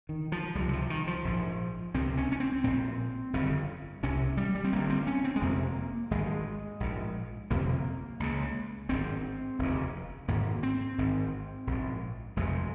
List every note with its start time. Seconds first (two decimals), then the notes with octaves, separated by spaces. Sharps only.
0.09 D#3
0.32 F3
0.55 C#2 C3 G3
0.69 D#3
0.73 F3
0.90 D#3
1.07 F3
1.24 A#1 G#2
1.94 C#2 C3 C4
2.18 C#4
2.32 C#4
2.40 C4
2.64 A#1 A#2 C4
3.33 G1 F2 C#3
4.03 C2 C3 C#4
4.37 G3
4.55 G3
4.64 C4
4.72 G1 G2 A#3
4.90 C4
5.07 C#4
5.25 C4
5.36 G#3
5.42 F1 F2 C3 A#3
6.11 G#1 G2 G#3
6.80 A#1 G#2
7.50 G1 F2 C3 A#3
8.20 C#2 C#3
8.89 G#1 G2 C4
9.59 F1 D#2 C#3
10.28 G#1 G#2 A#3
10.63 C4
10.98 G#1 G#2
11.67 A#1 G#2
12.36 F1 F2 C3 G#3